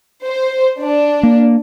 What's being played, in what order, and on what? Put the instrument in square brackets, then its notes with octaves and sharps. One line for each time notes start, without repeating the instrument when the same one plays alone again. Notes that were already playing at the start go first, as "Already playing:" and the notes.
[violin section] C5
D4
[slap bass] A#3